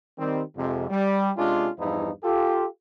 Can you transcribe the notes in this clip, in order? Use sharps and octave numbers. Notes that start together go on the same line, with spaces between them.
D#3 G3 C4
F2 G#2 C3
G3
C3 G#3 C#4 D4 F4
E2 G2 F3 D#4 E4 B4
F4 G4 A4